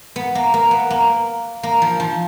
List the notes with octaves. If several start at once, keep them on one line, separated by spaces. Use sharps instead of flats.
B3
A#3
A#3
B3
A#3
A#3
F3
F3